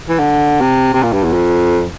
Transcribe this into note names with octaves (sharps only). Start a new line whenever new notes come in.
E3
D3
C3
C3
A#2
G2
E2
F2